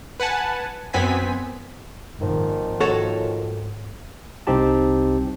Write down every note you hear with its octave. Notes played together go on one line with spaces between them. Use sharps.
B4 F#5 G#5 A5
F#2 B3 C4 G#5 B6
G#1 A#2 D#3 F3
G#2 F#4 A4 C#5
C2 C4 D#4 G4 A5